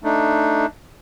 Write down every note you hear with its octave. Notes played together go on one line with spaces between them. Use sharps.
A3 D4 D#4